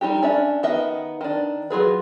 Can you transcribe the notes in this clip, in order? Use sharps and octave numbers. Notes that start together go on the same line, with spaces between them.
G3 D#4 F#4 G4
C#4 D4 E5
D#3 B3 D#5 E5
D#3 D4
F#3 F4 G#4 B4